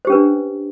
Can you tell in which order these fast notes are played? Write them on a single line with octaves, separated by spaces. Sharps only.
C5 G4 C#4 B4 D4